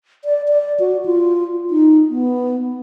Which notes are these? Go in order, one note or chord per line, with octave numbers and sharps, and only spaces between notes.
D5
D5
F#4
F4
D#4
B3